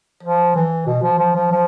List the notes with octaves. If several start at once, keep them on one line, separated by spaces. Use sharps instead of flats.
F3
E3
B2
F3
F3
F3
F3